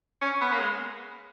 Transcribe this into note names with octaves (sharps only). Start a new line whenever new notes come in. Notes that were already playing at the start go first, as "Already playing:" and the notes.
C#4
B3
A#3
G#3